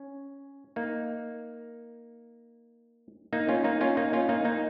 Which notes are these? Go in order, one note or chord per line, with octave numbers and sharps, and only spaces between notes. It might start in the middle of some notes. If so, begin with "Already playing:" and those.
Already playing: C#4
A#3 D#4
A#3 D#4
C#4 F4
A#3 D#4
C#4 F4
A#3 D#4
C#4 F4
A#3 D#4
A#3 D#4